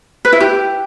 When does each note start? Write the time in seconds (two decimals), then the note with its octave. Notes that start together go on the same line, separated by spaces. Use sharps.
0.25 B4
0.33 E4
0.40 G4